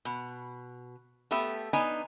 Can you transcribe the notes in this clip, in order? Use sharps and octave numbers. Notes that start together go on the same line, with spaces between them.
B2
A3 B3 G4 E5
B3 D4 D#4 G#5